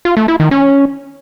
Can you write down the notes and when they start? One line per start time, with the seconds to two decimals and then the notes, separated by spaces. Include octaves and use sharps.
0.05 F4
0.17 A3
0.28 E4
0.40 D#3
0.51 C#4